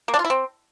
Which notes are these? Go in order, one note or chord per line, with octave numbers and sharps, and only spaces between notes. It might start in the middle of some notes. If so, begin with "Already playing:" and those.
A#3
D4
F4
E4
C4